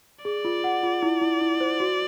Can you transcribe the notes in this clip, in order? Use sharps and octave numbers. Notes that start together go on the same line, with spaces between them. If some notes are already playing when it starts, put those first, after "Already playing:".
G#4 D5
F4
F#5
F4
E4
E4
E4
C5
F#4